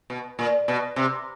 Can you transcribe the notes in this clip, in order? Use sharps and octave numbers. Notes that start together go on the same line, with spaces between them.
B2
A#2
B2
C3